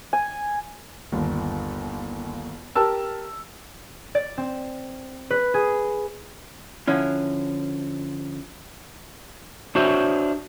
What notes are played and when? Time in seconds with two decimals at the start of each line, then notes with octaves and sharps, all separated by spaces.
0.13 G#5
1.12 G1 D#2
2.75 G4 A#4 A5 E6
4.15 D5
4.38 C4
5.30 B4
5.54 G#4
6.88 D3 F3 C#4 E4
9.75 D4 F#4 C5 C#5 E5